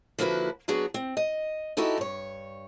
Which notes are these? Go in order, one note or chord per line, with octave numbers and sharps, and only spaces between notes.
D3 F3 A#3 E4 F#4 B4
F#3 B3 D4 F#4 G#4
C4
D#5
D#4 E4 F#4 G4 A4 D#5
G2 C#5